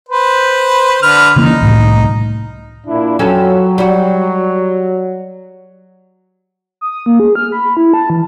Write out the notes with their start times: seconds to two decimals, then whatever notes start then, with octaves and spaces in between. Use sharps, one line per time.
0.09 B4 C5
1.03 D3 B4 F6
1.36 C#3 E3 A#3 D#4
1.61 C2 A2
2.87 A#2 D4 E4
3.19 F2 F#3 C#4 A4
3.78 G3 F#4
6.81 D#6
7.06 A#3
7.20 G#4
7.35 F6
7.52 B5
7.77 E4
7.94 A5
8.10 E3